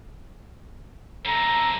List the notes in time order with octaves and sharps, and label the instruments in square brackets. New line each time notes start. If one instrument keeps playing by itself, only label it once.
[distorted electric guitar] F#2 C3 [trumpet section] A4 A#5